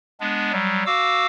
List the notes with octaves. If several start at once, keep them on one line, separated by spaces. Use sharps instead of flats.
G#3 B3 D4
F#3 G3
F#4 F5 D6 E6